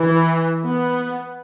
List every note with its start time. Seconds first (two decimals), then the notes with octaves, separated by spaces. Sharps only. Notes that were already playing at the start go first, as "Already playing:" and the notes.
Already playing: E3
0.64 B3